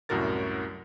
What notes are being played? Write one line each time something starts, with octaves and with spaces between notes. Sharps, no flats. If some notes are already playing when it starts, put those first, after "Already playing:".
C2 F#2 A2 F#4 A#4 A6